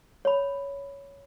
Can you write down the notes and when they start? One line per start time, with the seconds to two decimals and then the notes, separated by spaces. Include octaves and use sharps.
0.25 C#5 B5